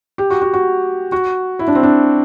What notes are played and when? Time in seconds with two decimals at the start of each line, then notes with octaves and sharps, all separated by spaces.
0.18 G4
0.30 F#4
0.42 F#4
0.53 F#4
1.12 F#4
1.59 E4
1.68 D4
1.75 C4
1.83 D4